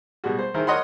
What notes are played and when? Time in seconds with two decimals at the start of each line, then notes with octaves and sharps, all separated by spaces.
0.24 B2 G3 G#3 F#4
0.39 C5
0.54 D#3 E4 G#4 A#4 C5
0.67 A#4 C#5 D#5 F#5 B5 C6